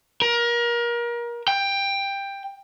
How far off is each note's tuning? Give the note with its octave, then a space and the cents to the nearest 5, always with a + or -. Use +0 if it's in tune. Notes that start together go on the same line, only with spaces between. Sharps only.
A#4 +30
G5 +15